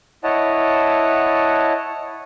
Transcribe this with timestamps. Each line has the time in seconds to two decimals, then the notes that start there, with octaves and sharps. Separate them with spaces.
0.24 E4 C#5 D#5 F#5 A5